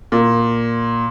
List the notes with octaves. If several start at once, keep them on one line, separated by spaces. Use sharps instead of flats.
A#2